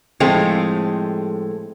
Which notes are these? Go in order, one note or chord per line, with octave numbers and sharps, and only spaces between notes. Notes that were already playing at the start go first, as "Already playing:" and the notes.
A2 F3 G#3 C4 G#4 A4